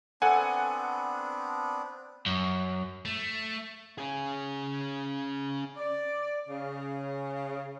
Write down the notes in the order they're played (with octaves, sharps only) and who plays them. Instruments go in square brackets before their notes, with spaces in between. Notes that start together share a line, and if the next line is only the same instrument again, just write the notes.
[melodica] B3 C4 D4 [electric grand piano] A4 F#5 G#5
[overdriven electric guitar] F#2
[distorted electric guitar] A3
[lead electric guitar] C#4 G#4
[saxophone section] D5
C#3